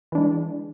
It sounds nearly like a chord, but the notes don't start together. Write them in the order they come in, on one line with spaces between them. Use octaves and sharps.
E3 D4 G#3